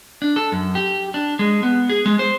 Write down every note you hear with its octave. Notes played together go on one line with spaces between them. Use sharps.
D4
A4
F#2
G4
D4
G#3
B3
G#4
G#3
C5